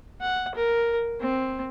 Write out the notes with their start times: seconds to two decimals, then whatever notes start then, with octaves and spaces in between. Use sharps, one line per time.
0.22 F#5
0.55 A#4
1.21 C4